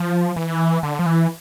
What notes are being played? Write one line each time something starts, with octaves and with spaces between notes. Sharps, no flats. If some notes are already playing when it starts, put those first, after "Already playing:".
Already playing: F3
E3
D3
F3
E3